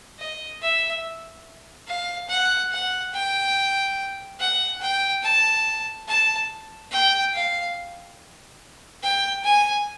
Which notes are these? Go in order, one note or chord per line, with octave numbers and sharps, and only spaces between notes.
D#5
E5
F5
F#5
F#5
G5
F#5
G5
A5
A5
G5
F5
G5
G#5